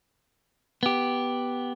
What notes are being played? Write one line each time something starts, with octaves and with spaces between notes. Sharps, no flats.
B3 G4